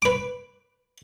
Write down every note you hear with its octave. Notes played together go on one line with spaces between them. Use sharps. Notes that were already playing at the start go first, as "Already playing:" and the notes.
B4 D6